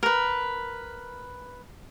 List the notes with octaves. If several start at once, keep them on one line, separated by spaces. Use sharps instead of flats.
A#4 B4